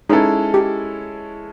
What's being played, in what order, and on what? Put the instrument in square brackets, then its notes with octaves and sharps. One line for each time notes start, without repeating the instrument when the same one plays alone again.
[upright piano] G#3 C#4 E4 A4 [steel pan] D#4
[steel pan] G4